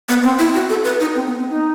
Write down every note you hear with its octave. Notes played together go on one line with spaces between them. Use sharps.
B3
C4
E4
F#4
A4
B4
D#4
C4
B3
C4
D#4